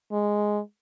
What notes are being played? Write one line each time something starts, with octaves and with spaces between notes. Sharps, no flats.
G#3